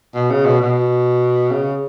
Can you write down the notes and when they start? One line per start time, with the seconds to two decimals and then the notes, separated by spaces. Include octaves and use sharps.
0.15 B2
0.31 C#3
0.45 B2
0.61 B2
1.51 C#3